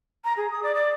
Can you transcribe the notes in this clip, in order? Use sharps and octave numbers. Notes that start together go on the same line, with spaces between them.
A#5
G#4
D#6
D5
D5